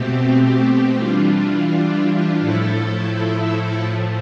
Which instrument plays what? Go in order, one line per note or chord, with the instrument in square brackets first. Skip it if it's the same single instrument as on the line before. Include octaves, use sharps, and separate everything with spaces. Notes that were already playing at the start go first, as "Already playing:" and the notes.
Already playing: [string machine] B2 A3 C4 G4
E3 G3 D4 F4
A2 F3 A3 E4 A4
A2 F3 A3